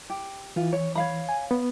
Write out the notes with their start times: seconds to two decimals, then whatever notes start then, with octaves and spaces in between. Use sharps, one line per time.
0.10 G4
0.56 E3 F4
0.73 C#5
0.95 C#5 F5 B5
1.29 G#5
1.51 B3